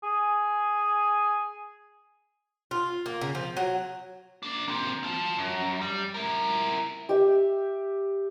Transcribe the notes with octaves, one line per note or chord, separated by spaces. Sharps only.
G#4
F4
A#3
C#3
F3
F#3
A#3 D4
A#3 C4
F4 A5
F#2
G3
E4 A#4
G4 E5